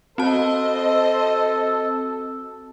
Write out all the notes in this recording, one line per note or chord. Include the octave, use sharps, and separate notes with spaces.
C4 F#4 A4 C5 D#5 A5